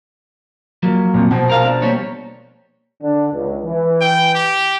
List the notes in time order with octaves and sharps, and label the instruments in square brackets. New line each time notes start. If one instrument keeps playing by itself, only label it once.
[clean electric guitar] F3 F#3 A#3
[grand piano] F2 A#2
B2 F3
[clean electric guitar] A#4 F5
D4
G3 A#3 C#5
[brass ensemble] D3 D4
C#2
E3
[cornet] G5
G4